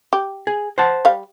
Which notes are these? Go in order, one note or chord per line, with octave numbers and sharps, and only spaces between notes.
G4
G#4
C5 F#5 A5
G3 F5